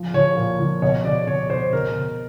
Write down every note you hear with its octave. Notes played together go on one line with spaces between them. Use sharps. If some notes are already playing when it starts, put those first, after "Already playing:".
Already playing: F3
F3 C#5
A#2
F3
B2 C#5
B2 D5
B2 C#5
B2 C5
B2 A#4
B2